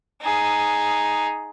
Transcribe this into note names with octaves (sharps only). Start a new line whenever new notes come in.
D#4 G#4